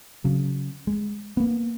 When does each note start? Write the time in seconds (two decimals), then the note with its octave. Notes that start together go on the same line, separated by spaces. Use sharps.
0.24 C#3 F#3
0.87 G#3
1.37 A#3 B3